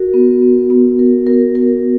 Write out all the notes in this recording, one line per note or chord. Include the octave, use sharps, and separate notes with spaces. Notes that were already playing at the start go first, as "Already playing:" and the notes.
Already playing: F#4 A#4
B3
B3
B3
A#4
A#4
A#4